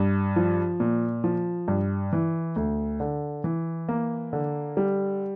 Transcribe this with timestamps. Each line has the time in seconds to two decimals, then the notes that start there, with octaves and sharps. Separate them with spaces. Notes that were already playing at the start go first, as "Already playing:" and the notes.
Already playing: G2
0.36 F3
0.80 A#2
1.24 F3
1.68 G2
2.13 E3
2.56 D2
3.00 D3
3.44 E3
3.89 A#3
4.33 D3
4.77 G3